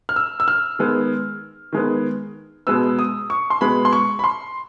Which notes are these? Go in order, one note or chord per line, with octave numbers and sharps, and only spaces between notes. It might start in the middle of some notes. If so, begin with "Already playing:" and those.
F6
E6
E6
F6
D#3 G#3 B3
D#3 G#3 B3
B2 G#3 B3 E6
D#6
C#6
C6
B2 G#3 B3 B5
C6
C#6
B5
C6